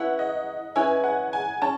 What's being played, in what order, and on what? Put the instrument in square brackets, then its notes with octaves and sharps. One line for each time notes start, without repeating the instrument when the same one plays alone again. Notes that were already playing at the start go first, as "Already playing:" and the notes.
Already playing: [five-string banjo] C#4 E4 B4 [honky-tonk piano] F#5
[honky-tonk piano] D#5
[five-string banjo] C#4 E4 B4 [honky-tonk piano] G#5
[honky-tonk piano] F#5
G#5
[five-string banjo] C#4 [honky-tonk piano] A5